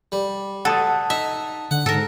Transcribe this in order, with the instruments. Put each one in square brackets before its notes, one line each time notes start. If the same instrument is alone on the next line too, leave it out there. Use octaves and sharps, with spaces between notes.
[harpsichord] G3
[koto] A4 [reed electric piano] F#5 A5 D#6
[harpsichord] D#4 [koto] E5
[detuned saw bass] D3 [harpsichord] F#5
[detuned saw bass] G#2 [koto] A4 A#4